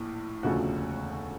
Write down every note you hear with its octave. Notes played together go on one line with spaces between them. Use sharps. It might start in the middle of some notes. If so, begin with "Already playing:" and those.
Already playing: A#1 A2
E1 D2 C#3 F3 A3 F#4